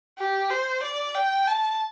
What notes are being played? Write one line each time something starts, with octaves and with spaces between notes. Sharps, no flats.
G4
C5
D5
G5
A5